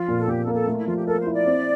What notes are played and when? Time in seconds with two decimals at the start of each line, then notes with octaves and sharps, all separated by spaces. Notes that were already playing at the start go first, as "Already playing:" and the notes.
Already playing: F3 F4
0.08 A#2
0.18 A4
0.28 A#2 G4
0.40 A4
0.47 A#3
0.54 A4
0.67 A3 F4
0.77 E4
0.87 F3 F4
0.96 G4
1.07 A4 A#4
1.20 C5
1.26 E4
1.34 D5
1.46 C4